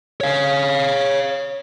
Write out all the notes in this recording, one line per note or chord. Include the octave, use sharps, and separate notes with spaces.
C#5 F5